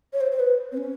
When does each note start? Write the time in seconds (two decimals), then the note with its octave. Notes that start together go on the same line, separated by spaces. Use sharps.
0.13 C#5
0.21 C5
0.31 C5
0.40 B4
0.72 C4
0.77 C#4